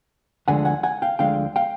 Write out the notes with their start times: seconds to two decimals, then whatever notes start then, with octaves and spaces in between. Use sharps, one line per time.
0.48 D2 D3 F3 G#3 F#5 G#5
0.65 F#5 G#5
0.83 F#5 G#5
1.02 F5 G5
1.19 D2 D3 F3 G#3 F5 G5
1.56 F5 G5